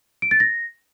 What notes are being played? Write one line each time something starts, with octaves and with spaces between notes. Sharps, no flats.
D7
A6
A#6